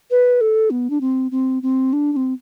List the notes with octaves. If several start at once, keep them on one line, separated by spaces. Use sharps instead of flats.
B4
A4
B3
D4
C4
C4
C4
D4
D4
C4